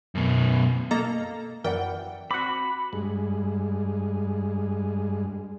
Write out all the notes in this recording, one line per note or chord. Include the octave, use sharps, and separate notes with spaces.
F#2 B2
A#3 A4 D#5 A#5
F#2 E3 A#4 D5 F#5 G5
C4 F#4 B5 D6
G2 G#3